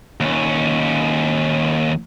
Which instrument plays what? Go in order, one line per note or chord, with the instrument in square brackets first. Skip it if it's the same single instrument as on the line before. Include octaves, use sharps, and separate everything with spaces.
[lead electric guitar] D#2 C#4